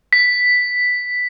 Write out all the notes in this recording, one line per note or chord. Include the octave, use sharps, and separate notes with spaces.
B6